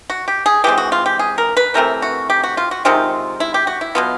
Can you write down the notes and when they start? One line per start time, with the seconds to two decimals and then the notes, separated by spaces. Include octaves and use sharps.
0.10 F#4
0.28 G4
0.46 G#4
0.64 E3 G#3 C4 G4
0.78 F#4
0.92 F4
1.06 G4
1.19 G#4
1.38 A#4
1.57 B4
1.74 C3 E3 A3 C4 A#4
2.02 F#4
2.30 G4
2.43 F#4
2.57 F4
2.71 F#4
2.85 C3 D#3 G#3 C4 F4
3.40 E4
3.54 G4
3.67 F#4
3.81 E4
3.95 B2 F#3 B3 F4